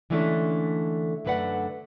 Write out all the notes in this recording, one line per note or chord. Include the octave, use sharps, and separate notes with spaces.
D3 E3 G#3 A3 C#4 D4
F#2 D3 A3 B4 D5 F#5